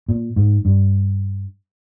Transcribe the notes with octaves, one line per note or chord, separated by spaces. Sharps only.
A#2
G#2
G2